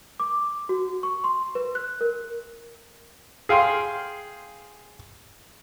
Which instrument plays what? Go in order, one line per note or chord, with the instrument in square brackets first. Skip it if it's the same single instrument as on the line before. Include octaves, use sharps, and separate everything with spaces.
[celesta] D6
F#4
C#6
C6
B4
F#6
A#4
[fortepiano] G#4 F5 G5 C6